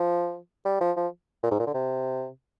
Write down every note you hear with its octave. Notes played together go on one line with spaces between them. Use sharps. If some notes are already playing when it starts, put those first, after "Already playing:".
Already playing: F3
G3
F3
F3
A#2
G#2
A#2
D3
C3